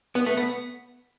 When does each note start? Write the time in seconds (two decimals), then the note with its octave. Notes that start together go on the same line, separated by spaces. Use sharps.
0.15 B3
0.26 A3
0.37 B3